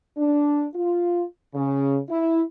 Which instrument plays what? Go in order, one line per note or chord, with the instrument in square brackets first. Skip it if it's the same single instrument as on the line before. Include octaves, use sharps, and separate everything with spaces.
[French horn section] D4
F4
C#3
E4